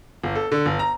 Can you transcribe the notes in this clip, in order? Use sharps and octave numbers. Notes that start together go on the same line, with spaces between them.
G1
A4
D3
G1
A#5